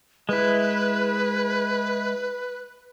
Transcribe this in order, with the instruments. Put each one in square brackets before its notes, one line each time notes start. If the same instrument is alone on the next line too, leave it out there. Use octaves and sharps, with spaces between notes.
[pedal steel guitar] G#3 E4 [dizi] B4